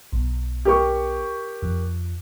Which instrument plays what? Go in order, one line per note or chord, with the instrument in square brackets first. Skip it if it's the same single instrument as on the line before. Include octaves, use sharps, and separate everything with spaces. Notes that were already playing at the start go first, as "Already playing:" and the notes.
[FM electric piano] B1
[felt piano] G4 A#4 C#6
[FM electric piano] F2